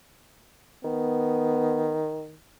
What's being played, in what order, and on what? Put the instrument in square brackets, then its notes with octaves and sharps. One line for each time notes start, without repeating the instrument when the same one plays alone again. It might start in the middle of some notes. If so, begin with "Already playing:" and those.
[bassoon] D#3 [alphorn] B3